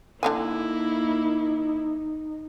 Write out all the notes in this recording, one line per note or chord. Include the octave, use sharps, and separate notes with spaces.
D3 E3 A#3 D#4 E4 G#5